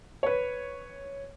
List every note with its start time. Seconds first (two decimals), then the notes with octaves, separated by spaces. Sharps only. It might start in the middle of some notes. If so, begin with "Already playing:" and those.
0.23 B4 C#5